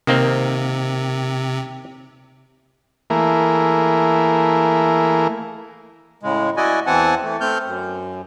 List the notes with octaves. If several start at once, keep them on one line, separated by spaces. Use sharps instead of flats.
C3 D#3 A#3 C4
E3 A3 A#3 E4 G#4 A#4
A2 C#3 G#3
E4 F#4 D5 D#5 G#5
E2 E3 C4 F#5 G#5 A5
E3 A3
A3 C4 F6 G6
F#2